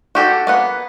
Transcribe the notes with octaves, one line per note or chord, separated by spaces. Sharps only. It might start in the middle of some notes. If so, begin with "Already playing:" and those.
F#4 G4 A4
A#3 B3 F#5